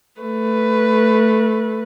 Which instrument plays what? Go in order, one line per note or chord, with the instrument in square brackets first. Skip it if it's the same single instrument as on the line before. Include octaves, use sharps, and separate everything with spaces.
[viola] A3 B4